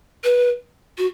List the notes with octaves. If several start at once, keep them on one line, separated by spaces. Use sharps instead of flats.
B4
F#4